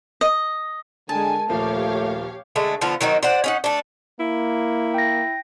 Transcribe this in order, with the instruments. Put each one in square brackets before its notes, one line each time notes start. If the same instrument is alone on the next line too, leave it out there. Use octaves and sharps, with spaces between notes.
[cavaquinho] D#5
[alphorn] D3 [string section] G#3 A#4 G#5 [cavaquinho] A5
[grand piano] D#1 F3 A#3 [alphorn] A3 [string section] G4 C#5 F5
[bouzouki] D3 G#3 A3
D3 F3 B3 F4
D#3 F#3 C4 D#4
C5 D5 F#5
C#4 D#4 F#5
A3 D4
[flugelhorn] A#3 [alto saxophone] E4
[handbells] G5 A#6